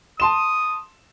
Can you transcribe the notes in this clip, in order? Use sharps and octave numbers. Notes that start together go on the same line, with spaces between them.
A5 C6 D#6 E7